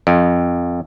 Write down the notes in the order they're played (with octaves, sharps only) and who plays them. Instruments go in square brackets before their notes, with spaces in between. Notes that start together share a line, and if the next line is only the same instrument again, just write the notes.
[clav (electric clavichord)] F2